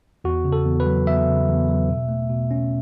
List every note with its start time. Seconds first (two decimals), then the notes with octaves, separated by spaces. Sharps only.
0.24 E2 F#4
0.45 C#3
0.53 A4
0.66 E2
0.80 B4
0.86 F#3
1.06 E2 E5
1.28 C#3
1.48 E2
1.68 F#3
1.89 B2
2.09 A3
2.29 B2
2.51 C#4